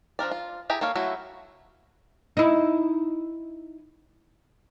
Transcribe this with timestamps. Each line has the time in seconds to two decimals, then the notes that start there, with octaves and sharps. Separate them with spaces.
0.19 F3 D4 A#4 D5
0.31 F4
0.70 E4 G4 G#4 A#5
0.81 A#3 A4 C#5 F5
0.95 F#3 A3 E4 F#4
2.37 D#4 E4